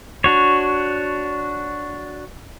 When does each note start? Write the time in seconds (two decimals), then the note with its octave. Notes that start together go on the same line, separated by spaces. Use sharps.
0.24 D4 F#4 C#5